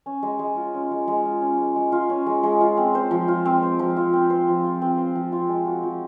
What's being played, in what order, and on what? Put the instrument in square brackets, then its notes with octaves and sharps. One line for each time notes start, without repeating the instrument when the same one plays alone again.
[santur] C#4
G#3
G#3
F4
C#4
G#3
G#3
F4
C#4
G#3
G#3
F4
C#4
G#3
G#3
F4
C4
C5
F3
F4
C4
C5
F3
F4
C4
C5
F3
F4
C4
C5
F3
F4
G#3
F#4
F3